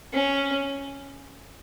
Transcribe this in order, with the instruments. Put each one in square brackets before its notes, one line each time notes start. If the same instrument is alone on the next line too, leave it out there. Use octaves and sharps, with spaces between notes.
[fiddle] C#4